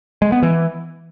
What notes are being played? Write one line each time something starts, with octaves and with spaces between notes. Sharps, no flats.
G#3
B3
E3